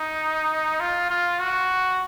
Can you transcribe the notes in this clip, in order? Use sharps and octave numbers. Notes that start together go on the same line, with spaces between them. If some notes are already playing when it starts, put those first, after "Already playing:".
Already playing: D#4
F4
F4
F#4